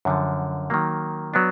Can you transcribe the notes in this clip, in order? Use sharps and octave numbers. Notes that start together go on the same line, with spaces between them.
F#2 D3 F3
D#3 F#3 A#3
F#3 B3 D4